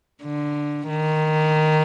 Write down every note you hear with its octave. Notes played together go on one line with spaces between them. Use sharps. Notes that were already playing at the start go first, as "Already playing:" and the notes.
D3
D#3